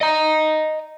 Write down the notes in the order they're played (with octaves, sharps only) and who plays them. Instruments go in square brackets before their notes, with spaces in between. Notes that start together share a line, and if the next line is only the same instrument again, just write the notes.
[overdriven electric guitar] D#5 A#5